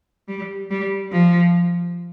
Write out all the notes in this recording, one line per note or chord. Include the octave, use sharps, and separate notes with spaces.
G3
G3
F3